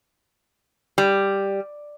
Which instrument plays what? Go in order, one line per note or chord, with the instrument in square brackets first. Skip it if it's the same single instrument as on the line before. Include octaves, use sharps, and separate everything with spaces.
[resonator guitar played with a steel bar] G3